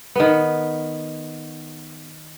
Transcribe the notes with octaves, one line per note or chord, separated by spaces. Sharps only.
D#3 B3